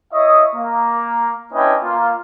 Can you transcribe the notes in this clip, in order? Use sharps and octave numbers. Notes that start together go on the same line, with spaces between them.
E4 C#5 D#5 E5 C#6 D#6
A#3
C#4 D4 E4 B4 D#5 G5
A#3 F4